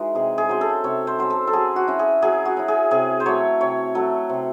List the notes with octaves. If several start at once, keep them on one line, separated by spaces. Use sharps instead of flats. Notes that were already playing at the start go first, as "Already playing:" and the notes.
Already playing: E3 G#3 D#4 F#4
C3 G#4
G#4
F#3 C#4 C5
A4
C3 C#5
C5
F#3 C#4 C5
A4
A4
F#3 G#4
F#4
C#4 E4
G#4
F#3 G#4
F#4
C#4 E4
G#4
C3 G#4
C5
F#3 A3 C#5
C3 C#5
F#3 A3
C3